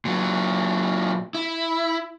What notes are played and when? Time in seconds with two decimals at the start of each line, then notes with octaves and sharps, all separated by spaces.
0.05 A#2 F#3
1.35 E4